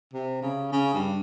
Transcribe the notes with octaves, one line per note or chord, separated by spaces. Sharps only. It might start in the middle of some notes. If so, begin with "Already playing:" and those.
C3
C#3
C#3
G2